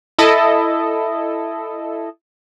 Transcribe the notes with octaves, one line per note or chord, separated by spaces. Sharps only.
E4 A4 D#5